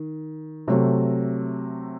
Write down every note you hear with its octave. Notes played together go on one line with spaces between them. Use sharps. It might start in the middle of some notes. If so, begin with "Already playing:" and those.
Already playing: D#3
C3 F#3 A3